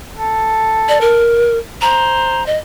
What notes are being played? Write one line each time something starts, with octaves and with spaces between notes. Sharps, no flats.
A4
D5
A#4
C5 A#5
D#5